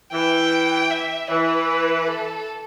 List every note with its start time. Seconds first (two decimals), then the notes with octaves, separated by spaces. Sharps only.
0.12 E3 G5
0.90 E5
1.29 E3 B4
2.06 A4